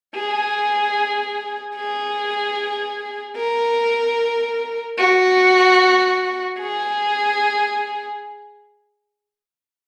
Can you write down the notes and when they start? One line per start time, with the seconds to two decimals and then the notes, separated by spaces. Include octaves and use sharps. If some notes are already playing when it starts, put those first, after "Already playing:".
0.15 G#4
1.76 G#4
3.37 A#4
4.98 F#4
6.59 G#4